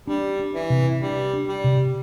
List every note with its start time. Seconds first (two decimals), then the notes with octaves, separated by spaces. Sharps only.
0.07 G3 D4
0.39 D4
0.55 E3
0.70 C3
1.01 G3 D4
1.33 D4
1.48 G3
1.64 C3